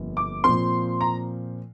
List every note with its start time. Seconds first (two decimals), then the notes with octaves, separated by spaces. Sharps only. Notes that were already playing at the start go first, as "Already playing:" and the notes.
Already playing: G1 F2 D3 A#3
0.17 D6
0.44 A#2 F3 C4 C6
1.01 A#5